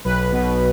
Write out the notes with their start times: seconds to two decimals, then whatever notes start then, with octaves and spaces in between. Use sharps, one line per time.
0.05 B1 B4
0.32 B2